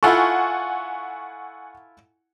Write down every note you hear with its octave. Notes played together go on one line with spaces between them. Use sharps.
E4 F4 A4 F#5 G#5 C#6